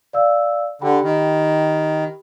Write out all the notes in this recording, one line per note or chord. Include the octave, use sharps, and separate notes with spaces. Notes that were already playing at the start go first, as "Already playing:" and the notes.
D5 F5 E6
D3 G4 G5 B5
D#3